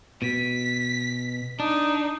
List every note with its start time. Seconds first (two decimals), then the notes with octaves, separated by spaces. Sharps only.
0.22 B2 B6
1.60 D4 D#4